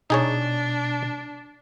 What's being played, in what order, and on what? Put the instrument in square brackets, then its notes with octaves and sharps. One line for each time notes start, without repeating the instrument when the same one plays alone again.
[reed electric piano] B2 [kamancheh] D4 [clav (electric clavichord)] D#4 G#4 C#5